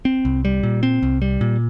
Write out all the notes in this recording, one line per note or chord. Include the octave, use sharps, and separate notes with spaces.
C4
C2
G3
A#2
C4
C2
G3
A#2